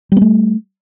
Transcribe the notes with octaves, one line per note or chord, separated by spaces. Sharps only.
G3 A3 B3